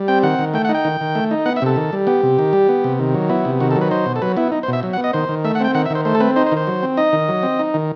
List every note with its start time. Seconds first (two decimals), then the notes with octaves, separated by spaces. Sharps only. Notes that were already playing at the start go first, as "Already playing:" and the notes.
Already playing: G3
0.08 C4 G5
0.23 D#3 F#5
0.39 D#3
0.54 A3 G5
0.65 F#5
0.69 D#4
0.74 G5
0.85 D#3
1.01 D#3
1.15 A3
1.31 D#4
1.46 B3 F#5
1.56 E5
1.62 C3 A4
1.76 D#3
1.93 G3
2.07 B3 G4
2.23 C3
2.39 D#3
2.53 G3
2.69 B3
2.84 C3
2.99 D#3
3.14 F#3
3.30 B3 E4
3.45 C3
3.60 D#3 F#4
3.71 A4
3.76 F#3
3.81 B4
3.91 D#4 C5
4.06 B2
4.16 A4
4.22 F#3 B4
4.37 B3 E4
4.52 D#4
4.63 C5
4.68 B2
4.73 E5
4.83 F#3
4.93 F#5
4.98 B3
5.04 D#5
5.13 D#3 C5
5.29 D#3
5.44 A3 E5
5.55 F#5
5.60 C4 G5
5.75 D#3 F#5
5.86 E5
5.90 D#3 C5
6.05 A3 C5
6.15 A4
6.20 C4 B4
6.36 D#4 C5
6.46 C5
6.52 D#3
6.57 C5
6.67 F#3
6.82 C4
6.97 D#4 D#5
7.13 D#3
7.29 F#3
7.43 C4
7.59 D#4
7.74 D#3